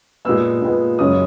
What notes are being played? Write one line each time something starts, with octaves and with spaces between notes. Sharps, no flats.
A#2 G#3 B3 E6
A#2 G#3 B3
F#2 C#3 G#3 C#4 D#6